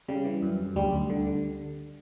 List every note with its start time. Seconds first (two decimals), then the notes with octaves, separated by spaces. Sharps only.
0.08 C#3 G3
0.25 E3
0.42 F#2
0.59 F#2
0.76 D2 G3
0.93 D2
1.10 D3
1.27 D3